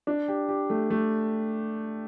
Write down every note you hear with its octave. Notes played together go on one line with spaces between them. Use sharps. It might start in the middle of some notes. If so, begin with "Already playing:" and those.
D4
G4
G4
A3
A3